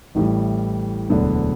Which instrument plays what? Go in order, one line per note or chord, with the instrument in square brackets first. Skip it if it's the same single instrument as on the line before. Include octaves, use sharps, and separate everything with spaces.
[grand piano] A1 A2 E3 G3
E1 D2 D3 F#3 B3